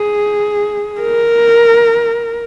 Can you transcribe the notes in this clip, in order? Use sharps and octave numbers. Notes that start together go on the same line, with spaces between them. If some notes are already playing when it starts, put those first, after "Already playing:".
Already playing: G#4
A#4